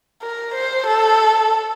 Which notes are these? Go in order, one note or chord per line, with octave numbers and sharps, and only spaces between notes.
A#4
C5
A4